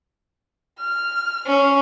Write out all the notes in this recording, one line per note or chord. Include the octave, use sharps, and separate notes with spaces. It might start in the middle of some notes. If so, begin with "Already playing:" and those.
F6
C#4